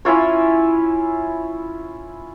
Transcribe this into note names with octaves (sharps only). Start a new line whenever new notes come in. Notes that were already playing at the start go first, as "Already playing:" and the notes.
C#4 E4 F4 C#5